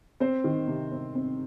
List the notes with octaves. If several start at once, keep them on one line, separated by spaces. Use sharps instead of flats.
C4 C5
D#3
C3
C4
C4